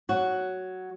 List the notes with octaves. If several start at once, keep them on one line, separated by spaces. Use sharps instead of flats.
F#3 F#4